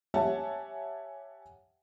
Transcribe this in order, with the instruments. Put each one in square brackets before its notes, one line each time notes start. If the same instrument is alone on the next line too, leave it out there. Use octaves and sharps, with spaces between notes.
[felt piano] G4 C#5 E5 F#5 G#5 A5